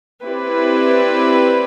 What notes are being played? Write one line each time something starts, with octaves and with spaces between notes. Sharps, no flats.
C4 E4 G4 B4 D5